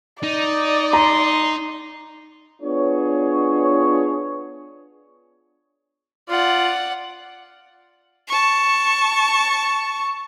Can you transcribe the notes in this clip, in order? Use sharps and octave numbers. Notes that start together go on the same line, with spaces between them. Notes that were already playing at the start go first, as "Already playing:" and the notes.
D#4 D5
A#5 C6
B3 D4 F4 G#4 C#5
F4 D5 F#5
A5 C#6